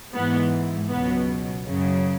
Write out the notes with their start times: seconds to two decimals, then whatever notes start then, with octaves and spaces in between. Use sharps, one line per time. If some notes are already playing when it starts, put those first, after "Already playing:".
0.14 G#2 E3 B3
0.90 C#2 B2 F#3 B3
1.64 F#2 C#3 F#3